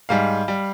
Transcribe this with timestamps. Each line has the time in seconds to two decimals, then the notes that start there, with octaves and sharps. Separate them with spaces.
0.09 G#2 G3 F5
0.48 G3